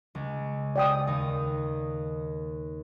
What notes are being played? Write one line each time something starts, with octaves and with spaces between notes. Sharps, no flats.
C#2
D5 G5 D#6
D#2 D#4